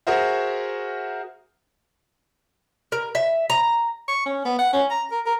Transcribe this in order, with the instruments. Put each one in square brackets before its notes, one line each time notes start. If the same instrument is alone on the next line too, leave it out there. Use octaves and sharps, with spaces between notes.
[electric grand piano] F#4 G#4 A#4 C5 E5 F#5
[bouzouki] A#4
E5
A#5
[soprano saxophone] C#6
C#4
B3
F#5
C#4
A#5
A#4
A#4